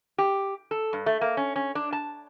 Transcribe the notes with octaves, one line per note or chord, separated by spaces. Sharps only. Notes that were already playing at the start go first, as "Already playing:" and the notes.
G4
A4
G2
A3
A#3
C#4
C#4
D4
A5